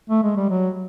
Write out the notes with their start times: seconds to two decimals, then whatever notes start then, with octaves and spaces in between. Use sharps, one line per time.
0.10 A3
0.23 G#3
0.36 G3
0.50 F#3